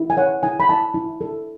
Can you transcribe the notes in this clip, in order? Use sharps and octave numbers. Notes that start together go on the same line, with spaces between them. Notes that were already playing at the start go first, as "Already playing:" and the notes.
Already playing: E4
G#5
C#5 F#5
E4 G#5
B5
E4 A5
E4
A4